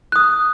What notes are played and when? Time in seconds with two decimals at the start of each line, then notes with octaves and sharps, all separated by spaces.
0.12 D#6 F#6